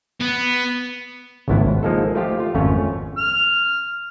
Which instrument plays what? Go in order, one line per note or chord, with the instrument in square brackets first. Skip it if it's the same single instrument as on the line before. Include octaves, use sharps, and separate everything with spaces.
[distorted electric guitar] B3
[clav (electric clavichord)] G#1 C#2 G2 B3 E4
G#1
F3 G#3 A#3 D#4 A4
F3 A3 F4 G4
F4
G#1 F2 A3 C#4 C#5
[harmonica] F6